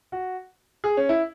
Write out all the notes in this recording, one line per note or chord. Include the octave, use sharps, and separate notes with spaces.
F#4
G#4
C#4
E4